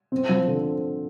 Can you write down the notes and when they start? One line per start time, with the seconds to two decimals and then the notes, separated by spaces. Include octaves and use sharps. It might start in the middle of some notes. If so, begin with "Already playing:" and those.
0.12 C4
0.29 F3
0.47 D3